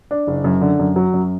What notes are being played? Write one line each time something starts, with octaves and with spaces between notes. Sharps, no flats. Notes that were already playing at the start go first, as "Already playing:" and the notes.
D4
F#1
F#2
D3
F#2
F#3
F#2